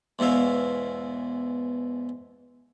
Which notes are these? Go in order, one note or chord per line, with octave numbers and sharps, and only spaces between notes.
E2 G#2 B2 E5 F5